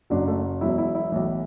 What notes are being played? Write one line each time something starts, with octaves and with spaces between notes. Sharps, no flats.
F#1 F#2 F#3 D4
A3
E1 E2 B2 F#3 E4
E4
E4
B1 A2 E3